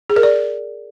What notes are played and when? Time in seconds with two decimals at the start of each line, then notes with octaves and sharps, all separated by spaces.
0.10 G#4
0.16 A#4
0.23 D5